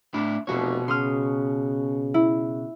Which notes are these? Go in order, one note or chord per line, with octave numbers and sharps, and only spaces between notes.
A2 D4 E4
F1 B2 F#4 C#5
C#3 C6 D#6 F6
E4